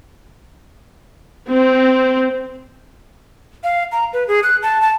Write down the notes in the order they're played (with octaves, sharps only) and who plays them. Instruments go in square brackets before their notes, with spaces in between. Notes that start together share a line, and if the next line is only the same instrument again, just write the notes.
[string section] C4
[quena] F5
A#5
B4
G#4
F#6
A5
A5